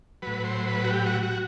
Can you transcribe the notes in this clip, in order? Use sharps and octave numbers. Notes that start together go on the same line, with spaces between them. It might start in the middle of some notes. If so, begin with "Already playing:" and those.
A2 F#3 B4
C5
B4
F#4
G4
F#4
F#4